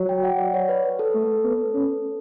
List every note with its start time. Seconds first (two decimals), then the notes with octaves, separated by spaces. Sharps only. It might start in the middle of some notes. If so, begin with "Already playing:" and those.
Already playing: F#3
0.09 G5
0.24 F#5
0.38 D5
0.54 C#5
0.69 B4
0.84 B4
0.99 A4
1.14 A3
1.44 B3
1.74 C#4